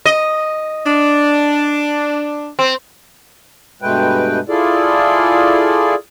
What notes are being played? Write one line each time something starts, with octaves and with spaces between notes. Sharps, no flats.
D#5
D4
C4
G2 B2 G#3 A3 B4 G5
E4 F4 G#4 A4 D5